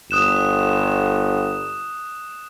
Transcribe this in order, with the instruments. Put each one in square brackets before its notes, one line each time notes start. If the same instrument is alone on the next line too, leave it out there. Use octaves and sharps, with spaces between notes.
[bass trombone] G1 [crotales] D#6 F#6 E7